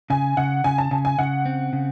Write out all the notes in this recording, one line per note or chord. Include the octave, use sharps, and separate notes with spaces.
C#3 G#5
C#3 F#5
C#3 G#5
A5
C#3 G#5
G#5
C#3 F#5
C4
C#3